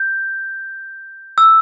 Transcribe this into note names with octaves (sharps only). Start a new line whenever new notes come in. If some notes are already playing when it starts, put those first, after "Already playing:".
Already playing: G6
E6